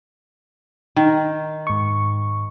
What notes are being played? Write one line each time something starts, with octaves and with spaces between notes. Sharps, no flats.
D#3
G#2 C#6